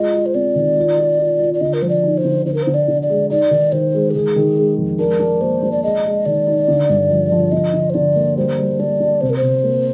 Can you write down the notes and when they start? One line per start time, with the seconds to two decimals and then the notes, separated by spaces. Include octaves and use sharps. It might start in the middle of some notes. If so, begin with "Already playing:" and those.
Already playing: G#3 F4 D#5
0.13 F4
0.26 C5
0.35 C4 D5
0.55 D#3
0.77 F4
0.98 F4
1.19 F4
1.40 F4
1.54 D5
1.61 D3 D#5
1.74 A#4
1.82 F3 C5
1.89 D5
2.03 D#4
2.18 C5
2.25 D3
2.46 D3 C5
2.54 A#4
2.63 D3 C5
2.74 D5
2.88 D3
3.02 D5
3.09 G#3
3.30 D#4 D5
3.51 D#3
3.72 D#3 C5
3.94 G#3
4.11 G4
4.14 D#3 G#4
4.36 D#3
4.56 G#3
4.78 F2
4.99 D4 A#4
5.20 D4
5.41 A#3 C5
5.63 D4
5.72 D5
5.83 G#3 D#5
6.05 G#3
6.26 D#3 D5
6.47 D#4
6.68 D3
6.89 G2
7.10 F3
7.32 F3
7.52 D3 D#5
7.74 D3
7.90 C5
7.94 D3 D5
8.16 A#3
8.37 G3 C5
8.58 G3
8.79 D4 D5
9.00 D4
9.21 C3 C5
9.30 A#4
9.36 C5
9.42 C3
9.64 A#3